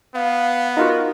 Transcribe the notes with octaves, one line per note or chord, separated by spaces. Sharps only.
B3 F5
D#4 F4 F#4 A#4